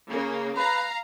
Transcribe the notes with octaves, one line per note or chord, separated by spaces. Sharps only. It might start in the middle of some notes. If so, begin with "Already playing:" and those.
C#3 A#3
B4 F5 A#5